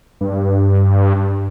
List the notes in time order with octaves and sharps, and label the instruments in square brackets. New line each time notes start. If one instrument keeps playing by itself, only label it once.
[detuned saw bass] G2